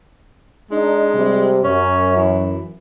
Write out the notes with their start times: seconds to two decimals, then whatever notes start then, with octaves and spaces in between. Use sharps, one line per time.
0.71 G#3 D4 D#4
1.14 C3 G3
1.64 F#2 C#4
2.17 E3